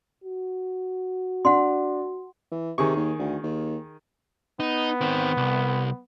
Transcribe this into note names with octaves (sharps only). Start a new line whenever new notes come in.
F#4
D4 F#5 C6
E3
C3 D#3 G#4 C#6
D#2
D2
D#2
B3 D#4
D#3 C4
C2